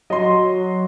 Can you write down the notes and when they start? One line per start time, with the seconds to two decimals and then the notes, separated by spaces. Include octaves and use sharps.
0.10 F#3 D#5 C6